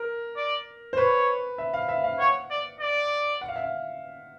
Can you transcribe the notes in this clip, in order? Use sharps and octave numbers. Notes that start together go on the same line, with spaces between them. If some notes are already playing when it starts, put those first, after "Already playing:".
Already playing: A#4
D5
C5
B4 C#5
E5
F5
E5
F5
C#5 F#5
D5
D5
F#5
F5
E5
F5